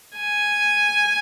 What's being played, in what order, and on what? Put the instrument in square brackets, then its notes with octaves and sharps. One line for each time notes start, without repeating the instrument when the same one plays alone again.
[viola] G#5